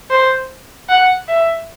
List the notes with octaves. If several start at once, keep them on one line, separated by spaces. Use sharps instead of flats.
C5
F#5
E5